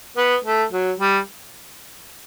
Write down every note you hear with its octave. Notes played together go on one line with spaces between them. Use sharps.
B3
A3
F#3
G3